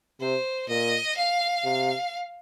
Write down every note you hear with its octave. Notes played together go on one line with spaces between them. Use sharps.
C3 C5
A#2 D#5
F5
C3